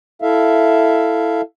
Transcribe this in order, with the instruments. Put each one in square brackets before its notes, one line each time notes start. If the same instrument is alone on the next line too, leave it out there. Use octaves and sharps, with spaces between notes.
[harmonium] E4 A4 E5 F5